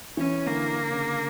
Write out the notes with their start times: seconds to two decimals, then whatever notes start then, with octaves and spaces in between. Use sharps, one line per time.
0.17 E3 C#4
0.46 D3 A#3
0.76 D3
0.91 C#3